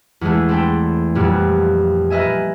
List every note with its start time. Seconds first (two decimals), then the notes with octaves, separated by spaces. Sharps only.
0.21 E2 G#3 A3
0.49 C4 A4 B4 G5
1.15 F2 A#2 G3 B3
2.10 A#4 B4 D#5 E5 G#5